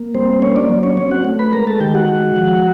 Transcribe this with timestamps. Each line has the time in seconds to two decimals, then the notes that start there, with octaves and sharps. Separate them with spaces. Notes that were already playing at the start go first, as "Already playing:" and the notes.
Already playing: A#3
0.15 G3 C4 C5
0.42 A#3 C#4 C#5
0.56 D4 D5
0.69 F#3
0.83 C#4 C#5
0.97 C4 C#4 C#5
1.11 F#4 F#5
1.25 A3
1.39 B4 B5
1.53 G#3 A#4 A#5
1.67 A4 A5
1.80 D#3 G4 G5
1.95 F#4 F#5
2.08 G#3
2.36 F3